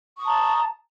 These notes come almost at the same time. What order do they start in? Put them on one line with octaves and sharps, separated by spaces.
C#6 D#6 A5 A#5